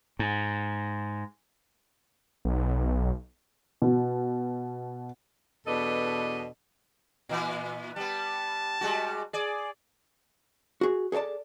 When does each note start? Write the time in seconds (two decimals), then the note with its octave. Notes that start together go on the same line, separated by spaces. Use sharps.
0.19 G#2
2.45 B1
3.82 B2
5.66 E2 B2 D4 A4 B4 D#5
7.29 A#2 E3 B3
7.96 G3 B3 A5
8.81 G3 G#3 F#4
9.33 G#4 D5
10.81 F#4 G#4
11.12 G#4 A4 C#5 D5 A5